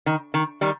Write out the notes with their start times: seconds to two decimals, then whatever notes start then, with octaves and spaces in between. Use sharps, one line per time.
0.06 D#3
0.34 D#3
0.61 D#3 G3